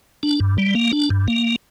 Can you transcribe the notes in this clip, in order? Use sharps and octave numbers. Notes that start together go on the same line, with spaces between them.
D4
G2
G3
A#3
D4
G2
A#3